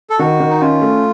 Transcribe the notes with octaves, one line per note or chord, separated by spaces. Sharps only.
A4
D#3 F#4
D#3
D#4
C#4 F4
A3